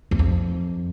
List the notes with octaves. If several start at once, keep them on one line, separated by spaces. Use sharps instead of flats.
E2
F2